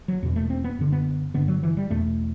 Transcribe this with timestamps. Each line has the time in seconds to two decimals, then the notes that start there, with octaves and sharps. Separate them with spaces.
0.08 F#3
0.23 E2 B2
0.36 A3
0.50 C4
0.64 B3
0.79 F#2 D3
0.92 B3
1.34 G2 D3 B3
1.48 F#3
1.63 E3
1.77 G3
1.90 E2 B2 A3